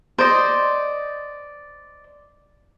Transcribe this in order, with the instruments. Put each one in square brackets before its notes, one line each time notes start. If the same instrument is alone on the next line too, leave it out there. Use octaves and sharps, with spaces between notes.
[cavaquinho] C5 D5 D#5